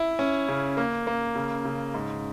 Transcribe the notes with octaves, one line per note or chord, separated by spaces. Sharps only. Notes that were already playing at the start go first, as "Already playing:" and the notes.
Already playing: E4
C#4
C#3
A#3
A#3
C#3
C#3
G#2